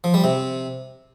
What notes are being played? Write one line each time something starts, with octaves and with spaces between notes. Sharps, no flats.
F3
G3
C3